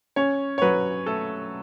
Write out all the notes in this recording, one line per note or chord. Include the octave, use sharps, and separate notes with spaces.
C#4 C#5
C#5
F#3 B4
A3 A4